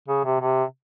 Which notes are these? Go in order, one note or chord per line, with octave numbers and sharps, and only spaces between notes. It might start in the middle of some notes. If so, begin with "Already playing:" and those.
C#3
C3
C3